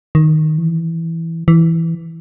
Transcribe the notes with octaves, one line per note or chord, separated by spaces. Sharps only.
D#3
E3
E3